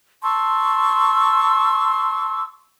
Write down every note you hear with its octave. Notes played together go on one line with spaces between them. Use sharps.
A5 C6 C#6 E6